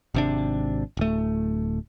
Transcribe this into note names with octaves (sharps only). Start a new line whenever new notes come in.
G#1 C3 D4
D1 A3